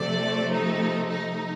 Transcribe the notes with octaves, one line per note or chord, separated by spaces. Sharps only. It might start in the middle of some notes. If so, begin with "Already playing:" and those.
Already playing: C3 F3 A3 D5
D#4
D#4